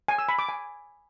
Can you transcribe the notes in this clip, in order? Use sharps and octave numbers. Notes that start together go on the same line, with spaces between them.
G#5
E6
B5
D6
G#5